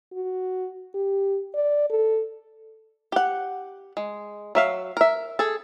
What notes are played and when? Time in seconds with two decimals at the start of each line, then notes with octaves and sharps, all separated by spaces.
0.13 F#4
0.95 G4
1.54 D5
1.90 A4
3.12 G4 F#5
3.97 G#3
4.55 F#3 E5 F5
4.97 A#4 E5
5.39 G#4 A4